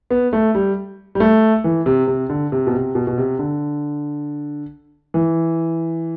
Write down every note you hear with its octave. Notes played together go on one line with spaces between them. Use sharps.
B3
A3
G3
G3
A3
E3
C3
C3
D3
C3
B2
C3
B2
B2
C3
D3
E3